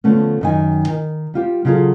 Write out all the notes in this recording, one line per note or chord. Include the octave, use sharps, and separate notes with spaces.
D3 F3 A3 B3 C#4
F#2 D#3 G#5
D#3
G3 F4 G4
C#3 F#3 F4 F#4 G#4 A4